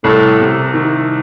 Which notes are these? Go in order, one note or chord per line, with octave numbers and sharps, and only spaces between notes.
C2 A2
C3
D#3